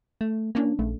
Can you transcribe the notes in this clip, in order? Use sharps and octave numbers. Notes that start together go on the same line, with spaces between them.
A3
E3 A#3 C#4 D4
A#1 A3